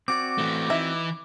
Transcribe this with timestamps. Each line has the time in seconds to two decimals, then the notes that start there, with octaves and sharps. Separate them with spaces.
0.08 C4 F#4 D5 D6
0.38 E3 A3
0.70 E3 D#4 E5